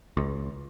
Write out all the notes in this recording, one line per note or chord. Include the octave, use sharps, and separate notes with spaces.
C#2